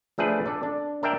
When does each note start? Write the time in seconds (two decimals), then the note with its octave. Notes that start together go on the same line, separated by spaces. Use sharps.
0.18 F3 A3 D4 G#4 B4
0.46 D4 A4 D5
0.63 D4
1.03 D4 A#4 D5 E5 G5